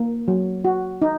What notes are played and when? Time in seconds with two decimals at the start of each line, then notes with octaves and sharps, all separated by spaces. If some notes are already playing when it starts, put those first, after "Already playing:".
Already playing: A#3
0.28 F#3
0.65 F#4
1.02 D#4